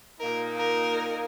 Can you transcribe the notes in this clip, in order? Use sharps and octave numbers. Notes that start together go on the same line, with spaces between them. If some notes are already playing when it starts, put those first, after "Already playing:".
A#2 A#3 D#4 A#4
A#4